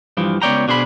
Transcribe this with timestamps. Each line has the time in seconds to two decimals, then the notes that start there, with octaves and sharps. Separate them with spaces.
0.17 G2 E3 F3
0.42 C#2 B3 C#5 D5 G5 A#5
0.68 B2 D4 G#4 C5 D5 B5